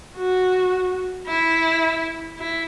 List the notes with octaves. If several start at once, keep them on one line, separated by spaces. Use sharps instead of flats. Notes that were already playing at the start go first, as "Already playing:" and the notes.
F#4
E4
E4